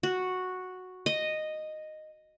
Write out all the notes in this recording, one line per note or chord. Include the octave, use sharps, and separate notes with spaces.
F#4
D#5